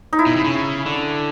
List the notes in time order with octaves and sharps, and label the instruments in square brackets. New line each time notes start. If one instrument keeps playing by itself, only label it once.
[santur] D#4
E4
[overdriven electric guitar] B2
C3
C#3
D3